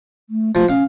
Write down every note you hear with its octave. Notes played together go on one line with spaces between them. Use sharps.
A3
F3 A3
C#4 F5